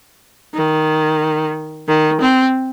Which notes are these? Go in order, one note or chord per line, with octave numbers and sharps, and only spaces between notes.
D#3
D#3
C4